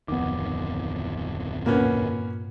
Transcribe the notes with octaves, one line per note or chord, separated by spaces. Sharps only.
D1 F2 D#3 B3 D6
G2 A#2 A#3 B3 C#4